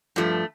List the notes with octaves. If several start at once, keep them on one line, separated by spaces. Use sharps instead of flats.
G2 F3 A3